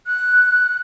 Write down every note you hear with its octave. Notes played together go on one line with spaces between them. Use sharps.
F#6